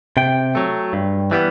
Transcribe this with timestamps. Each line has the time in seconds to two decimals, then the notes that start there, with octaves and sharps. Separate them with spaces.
0.17 C3 G5
0.55 F#3 A3
0.93 G2
1.31 E3 G3 B3